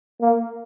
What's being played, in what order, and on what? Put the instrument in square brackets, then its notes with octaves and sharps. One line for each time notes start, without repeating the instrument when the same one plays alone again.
[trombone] A#3